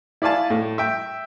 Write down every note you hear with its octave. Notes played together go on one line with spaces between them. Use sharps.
E4 D5 F5 G#5 A5
A2
E5 G5